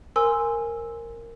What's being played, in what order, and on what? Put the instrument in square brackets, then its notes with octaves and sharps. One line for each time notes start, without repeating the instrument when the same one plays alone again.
[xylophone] A#4 C5 G#5 C6 E6